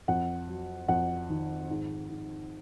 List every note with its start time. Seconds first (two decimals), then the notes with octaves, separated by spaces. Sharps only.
0.08 F2 F#5
0.48 F#3
0.88 F2 F#5
1.30 D#3
1.69 G#2
2.09 G#2